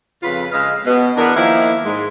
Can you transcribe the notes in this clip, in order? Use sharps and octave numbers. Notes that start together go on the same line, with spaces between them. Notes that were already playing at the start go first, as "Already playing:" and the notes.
F2 C#3 F4 B4
C#3 G#3 D#5 F5
B2
E2 B3 D4 A#4
D#3 F3 A#3 D#4 E4
G#2 G#3